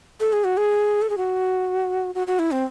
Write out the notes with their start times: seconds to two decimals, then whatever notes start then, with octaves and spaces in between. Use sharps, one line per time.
0.20 A4
0.33 G#4
0.44 F#4
0.57 G#4
1.02 A4
1.10 G#4
1.17 F#4
2.15 F#4
2.27 F#4
2.39 E4
2.51 C4